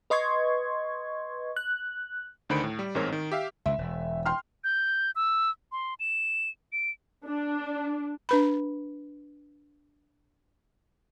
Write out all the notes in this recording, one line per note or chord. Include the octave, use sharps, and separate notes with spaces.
B4 D#5 C6 C#6 G#6
F#6
D2 D3 D#3 C5 B5 D7
A2
G3
A1 G#2 C4 A#4 C#5
D#3
G4 E5 F5
C#2 E5
E1
G5 C6 F6
G6
E6
C6
E7
D7
D4
D4 B4 B5